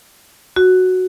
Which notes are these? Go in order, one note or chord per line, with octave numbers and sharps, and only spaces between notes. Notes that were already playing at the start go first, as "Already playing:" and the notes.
F#4